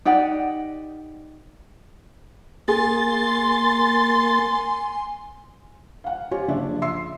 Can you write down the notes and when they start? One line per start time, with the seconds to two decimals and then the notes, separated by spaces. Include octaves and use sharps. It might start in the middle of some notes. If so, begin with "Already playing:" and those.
0.05 D#4 G4 D5 F#5
2.68 A#3 G#4 G#5 C6 A6
6.04 F5 F#5
6.31 F4 G4 C#5 G#5
6.48 F#1 C#3 F3 D4 D5 E5
6.82 E5 C6 E6 C7